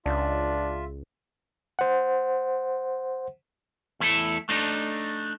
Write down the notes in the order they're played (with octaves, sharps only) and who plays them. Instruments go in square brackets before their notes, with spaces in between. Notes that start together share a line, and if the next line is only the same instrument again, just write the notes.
[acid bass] C#2 [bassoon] D4 [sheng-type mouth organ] F4 E5
[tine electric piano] C5 F#5
[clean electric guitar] E2 A3 E4 A4
A3 D4 D#4